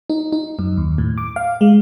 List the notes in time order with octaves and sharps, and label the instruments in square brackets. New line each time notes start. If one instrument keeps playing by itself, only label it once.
[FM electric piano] D#4
D#4
F#2
D#2
A2
D6
F5
G#3